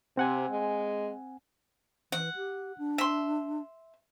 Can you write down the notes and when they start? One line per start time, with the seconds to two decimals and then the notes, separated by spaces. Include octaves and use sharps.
0.17 C3 C4 F#5 G#5
0.50 G#3
2.12 E3 F#5
2.36 G4
2.78 D4
2.98 E5 C6